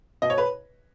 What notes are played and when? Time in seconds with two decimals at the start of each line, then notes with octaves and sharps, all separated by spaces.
0.22 B2 D#5
0.30 C#5
0.38 B4